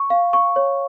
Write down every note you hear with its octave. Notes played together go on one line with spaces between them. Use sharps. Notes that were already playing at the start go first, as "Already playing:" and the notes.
Already playing: C#6
F5
C#6
C#5